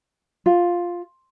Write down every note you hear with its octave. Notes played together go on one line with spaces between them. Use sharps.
F4